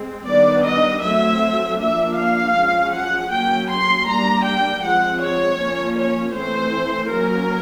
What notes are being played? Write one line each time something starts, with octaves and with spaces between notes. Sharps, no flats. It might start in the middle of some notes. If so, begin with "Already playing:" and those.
Already playing: G#3 C4
D#3 G3 B3 D4 D5
D#5
F#3 A3 C4 E5
F3 A#3 D4 E5
F5
F3 G#3 C#4
F#5
F#3 A#3 C#4 G5
C6
G3 A#3 D4 A#5
G5
F3 G#3 C4 F#5
C#5
F3 A#3 C#4
C#5
E3 A3 C4 C5
F#3 A#3 C#4 A#4